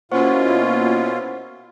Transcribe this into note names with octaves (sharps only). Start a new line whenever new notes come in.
B2 A#3 C#4 E4 F4 C5 F#5 C#6